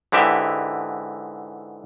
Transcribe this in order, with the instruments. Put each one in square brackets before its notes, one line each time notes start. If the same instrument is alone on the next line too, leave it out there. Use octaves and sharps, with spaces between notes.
[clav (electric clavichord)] G#2 D3 E3 G4 E5